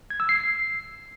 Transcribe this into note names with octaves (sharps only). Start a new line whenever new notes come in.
G#6
E6
C7